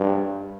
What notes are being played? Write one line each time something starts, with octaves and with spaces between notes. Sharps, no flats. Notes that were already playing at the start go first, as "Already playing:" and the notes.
Already playing: G2